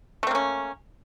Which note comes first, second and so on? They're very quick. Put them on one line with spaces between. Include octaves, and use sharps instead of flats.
A3 C4 A#3 C#4